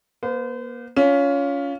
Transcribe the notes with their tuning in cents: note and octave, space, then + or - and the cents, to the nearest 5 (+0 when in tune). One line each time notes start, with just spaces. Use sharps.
A#3 +35 C5 -40
C#4 +20 F4 +0